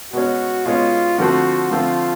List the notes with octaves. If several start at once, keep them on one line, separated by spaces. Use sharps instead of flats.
B2 G#3 C#4 F#4
B2 G#3 C#4 F4
D3 F3 A3 C4 F#4
D3 F3 A3 C4 F4